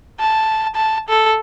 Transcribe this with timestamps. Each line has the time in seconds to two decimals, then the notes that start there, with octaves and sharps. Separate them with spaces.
0.20 A5
0.75 A5
1.09 A4